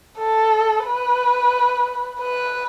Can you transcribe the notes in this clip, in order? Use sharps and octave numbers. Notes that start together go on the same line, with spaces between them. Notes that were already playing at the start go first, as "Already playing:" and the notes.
A4
B4
B4